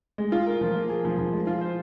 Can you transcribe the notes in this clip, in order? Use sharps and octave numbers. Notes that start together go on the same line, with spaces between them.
G#3
F4
A#4
F3
A#3
G#4
F3
F3
G#3
F4
C5